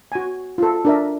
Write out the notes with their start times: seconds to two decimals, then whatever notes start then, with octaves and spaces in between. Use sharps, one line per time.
0.12 F#4 G#5
0.58 F4 A4
0.85 D4 A#4 E5